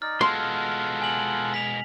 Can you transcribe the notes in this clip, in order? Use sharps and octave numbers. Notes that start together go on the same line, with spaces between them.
D#4 D5 F6
B2 G#3 F4 A4 F#5 C6
G#5 F#7
B6 F7